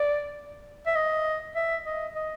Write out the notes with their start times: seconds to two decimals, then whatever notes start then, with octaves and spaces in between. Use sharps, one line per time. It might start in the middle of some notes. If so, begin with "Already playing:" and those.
Already playing: D5
0.86 E5
0.96 D#5
1.56 E5
1.86 D#5
2.15 D#5